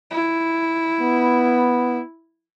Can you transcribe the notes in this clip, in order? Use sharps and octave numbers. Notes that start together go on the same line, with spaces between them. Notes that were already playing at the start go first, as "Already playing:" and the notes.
E4
B3